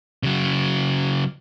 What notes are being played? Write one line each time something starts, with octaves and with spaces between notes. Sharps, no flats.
C#3 F#3